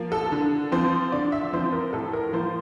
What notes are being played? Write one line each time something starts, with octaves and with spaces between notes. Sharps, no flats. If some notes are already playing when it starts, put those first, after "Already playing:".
Already playing: F3 A#3
A4
D3
F3 C4 C5
D3 D5
E5
F3 C4 C5
A#4
A2 A4
A#4
F3 A#3 C5